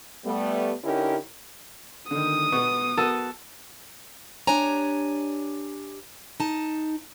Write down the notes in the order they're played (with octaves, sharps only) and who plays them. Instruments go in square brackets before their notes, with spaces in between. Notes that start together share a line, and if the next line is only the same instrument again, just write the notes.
[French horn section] G3 A3 B3
D3 C#4 D#4 E4 G4 A#4
[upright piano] D3 D#3 [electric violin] D#6
[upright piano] B2 B3 C#6
[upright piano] B3 F#4 A#4 [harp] A4
[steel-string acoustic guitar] D4 G4 C#5 G#5 A#5
D#4 A5